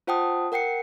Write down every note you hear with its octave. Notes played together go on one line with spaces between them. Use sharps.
F4 C5 F#5 G5 A5 D#6
A#4 F#5 G5 C7 C#7